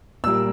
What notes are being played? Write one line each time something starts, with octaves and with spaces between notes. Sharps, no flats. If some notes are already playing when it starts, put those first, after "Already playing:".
A#2 G3 A#3 E6